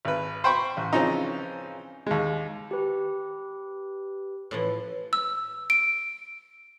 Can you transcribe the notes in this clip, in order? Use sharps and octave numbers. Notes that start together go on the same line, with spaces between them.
G#1 B4
C5 G5 B5 C#6
A1
C#3 E3 F3 C4 C#4 D#4
D#2 G#3
G4 B4
A2 E3 F3
E6
D7